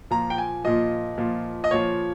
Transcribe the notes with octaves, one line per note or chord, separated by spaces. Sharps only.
A#2 F3 A#5
G5
G#5
A#2 F3 D#5
A#2 F3
D#5
A#2 F3 C#5